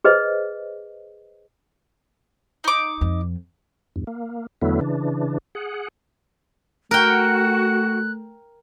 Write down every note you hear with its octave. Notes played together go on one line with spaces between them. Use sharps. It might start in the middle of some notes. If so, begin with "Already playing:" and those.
G#4 B4 C5 D#5
D#4 D6
F2
E2 G2
A#3
E2 D3 F#3 A3 B3 E4
C#3 E3 D4
G#4 F#5
A3 F#4 A#4 G5 F#6